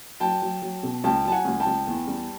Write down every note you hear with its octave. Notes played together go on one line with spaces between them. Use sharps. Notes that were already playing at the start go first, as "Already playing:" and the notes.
F#3 G5 A5
F#3
F#3
B2
C#2 G5 A5
F#3 A5
F#5 G#5
C#2
G5 A5
C#2
E2
G3